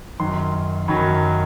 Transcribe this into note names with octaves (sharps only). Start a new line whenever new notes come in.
F#2 D#3 F#3 C6
F#2 D#3 F#3 B5